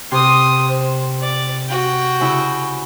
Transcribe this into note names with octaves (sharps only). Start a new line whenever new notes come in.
C3 C6 D#6
C5
D5
F#4 G5
C#3 E4